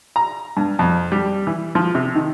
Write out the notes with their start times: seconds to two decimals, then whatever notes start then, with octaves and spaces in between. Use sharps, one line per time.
0.16 A#5
0.57 G2
0.79 F2
1.12 G3
1.47 E3
1.75 F3
1.95 C3
2.15 D#3